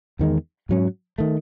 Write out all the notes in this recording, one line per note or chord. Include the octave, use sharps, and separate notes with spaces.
E2 D#3 G#3
G#2 F#3 C#4
D#3 A3